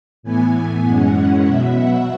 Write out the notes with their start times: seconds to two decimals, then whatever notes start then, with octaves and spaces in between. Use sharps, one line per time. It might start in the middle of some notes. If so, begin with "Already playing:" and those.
0.23 A2 E3 B3 G#5
0.84 F#2 E3 G#3 C#4 F#5
1.45 B2 F#3 B3 E5
1.75 F#5